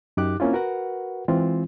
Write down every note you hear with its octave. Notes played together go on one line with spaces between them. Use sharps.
F#2 D#4 G4 D6 F#6
A#3 C4 C#4 E4 F4
F#4 A#4 B4 F#5
E3 G#3 C4 F4